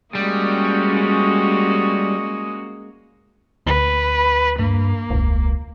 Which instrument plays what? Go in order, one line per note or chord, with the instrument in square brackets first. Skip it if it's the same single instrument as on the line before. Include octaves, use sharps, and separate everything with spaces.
[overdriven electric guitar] G3 [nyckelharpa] G#3 D#5 [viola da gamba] A#3 C#4 F#4
[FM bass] D2 [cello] B4
[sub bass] G2 [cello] A#3
[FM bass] E1 [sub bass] C#2